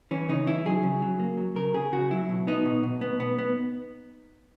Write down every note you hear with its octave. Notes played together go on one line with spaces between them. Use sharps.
E3 C#4
C#3 D#4
E3 E4
F#3 G#4
C#3
F#3
A#3
F#3
C#3 A#4
C#3 G#4
C#3 F#4
F#3 E4
B2
B3 D#4
B2
B2
B3
B3
B3